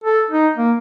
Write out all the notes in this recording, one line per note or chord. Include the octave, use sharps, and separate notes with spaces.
A4
D#4
A#3